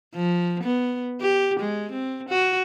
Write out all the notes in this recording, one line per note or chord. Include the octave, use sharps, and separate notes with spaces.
F3
B3
G4
G#3
C4
F#4